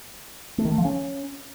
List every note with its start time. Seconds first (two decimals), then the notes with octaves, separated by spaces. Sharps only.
0.58 A3
0.65 D#3
0.71 A3
0.78 F3
0.85 C#4